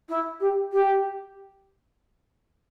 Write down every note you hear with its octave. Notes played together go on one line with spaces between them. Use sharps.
E4
G4
G4